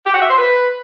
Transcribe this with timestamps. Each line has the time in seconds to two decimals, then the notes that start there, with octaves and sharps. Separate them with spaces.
0.06 G4
0.14 F#4
0.22 E5
0.30 C5
0.38 B4